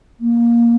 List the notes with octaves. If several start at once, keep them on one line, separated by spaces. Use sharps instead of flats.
A#3